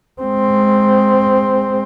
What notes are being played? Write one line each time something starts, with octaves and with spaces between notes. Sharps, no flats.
G#3 C4